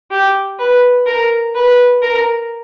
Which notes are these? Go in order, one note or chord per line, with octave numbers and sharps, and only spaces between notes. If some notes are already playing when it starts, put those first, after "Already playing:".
G4
B4
A#4
B4
A#4